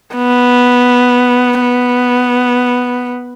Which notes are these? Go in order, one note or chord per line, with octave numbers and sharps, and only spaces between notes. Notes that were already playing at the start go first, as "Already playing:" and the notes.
B3
B3